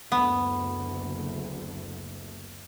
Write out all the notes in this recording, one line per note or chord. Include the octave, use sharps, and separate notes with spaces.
F#1 D2 B3